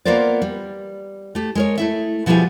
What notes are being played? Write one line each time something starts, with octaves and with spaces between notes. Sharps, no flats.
A#3 B3 F4 A#4 C5 D5
G3
A3 G4
G#3 A#4 C#5
A3 E4 E5
B2 F3 G3 E4 F4 G#4